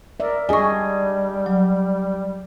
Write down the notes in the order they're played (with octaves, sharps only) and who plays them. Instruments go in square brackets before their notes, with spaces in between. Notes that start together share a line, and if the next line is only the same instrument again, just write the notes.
[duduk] A#4 [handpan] D5 E5
[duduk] G3 [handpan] D4 G#4 D#5 [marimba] G#5 C#6
[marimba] F#3